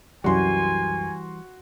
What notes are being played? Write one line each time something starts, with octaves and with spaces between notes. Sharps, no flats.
C2 F#2 E3 G3 F#4 G#5 C6